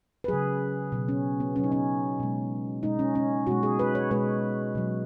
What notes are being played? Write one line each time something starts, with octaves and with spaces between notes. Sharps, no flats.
B4
C#3 F#3 G#4
B2 F#3
C#4
B3
B2 F#3 C#4
D#4
C#4
B2 G#3
B2 G#3 D#4
C#4
C#4
B2 G#3 F#4
G#4
B4
C#5
B2 G#3 B4
B2 F#3